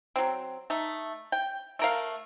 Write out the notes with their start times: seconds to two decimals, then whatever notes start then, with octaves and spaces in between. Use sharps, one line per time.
0.16 F#3 C4
0.70 A3 D#4
1.32 G5
1.79 A3 A#4 F5